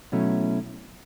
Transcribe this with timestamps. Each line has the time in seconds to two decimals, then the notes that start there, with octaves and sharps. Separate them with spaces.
0.12 B2 F#3 A3 C#4 E4